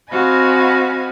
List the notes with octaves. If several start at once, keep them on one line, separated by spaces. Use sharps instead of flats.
C4 F#4 D#5 F5 G#5 B5